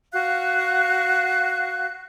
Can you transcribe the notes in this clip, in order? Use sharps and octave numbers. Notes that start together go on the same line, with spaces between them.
F#4 F5 F#6